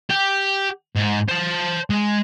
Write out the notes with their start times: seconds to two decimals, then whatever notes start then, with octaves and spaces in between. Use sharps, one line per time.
0.10 G4
0.96 G#2
1.29 C5 A5
1.90 G#3